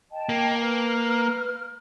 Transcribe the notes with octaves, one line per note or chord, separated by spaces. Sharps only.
D#5 G5 A5
A#3
B4 F6